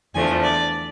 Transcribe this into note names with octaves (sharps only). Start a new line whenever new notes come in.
E2 D3 F3 A3 G#5
D5